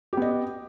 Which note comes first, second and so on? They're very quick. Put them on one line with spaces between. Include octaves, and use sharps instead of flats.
G4 B3 D#5